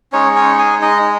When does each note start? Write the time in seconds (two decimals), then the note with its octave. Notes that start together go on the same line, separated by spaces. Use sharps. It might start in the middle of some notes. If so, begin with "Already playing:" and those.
0.12 G#3 C#4 D#4 C#5
0.35 C#4 C#5
0.59 G#4 G#5
0.82 D#4 D#5